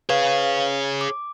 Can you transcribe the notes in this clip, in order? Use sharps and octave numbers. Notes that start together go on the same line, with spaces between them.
G#4 B4 C#5 F5
D6